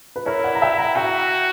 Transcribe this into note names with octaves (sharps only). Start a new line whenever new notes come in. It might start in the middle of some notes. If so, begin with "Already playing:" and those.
B4
E4 A#4 C#5
D5 F#5
A#5
E5 G5
F#5 A#5
F#4 E5 G5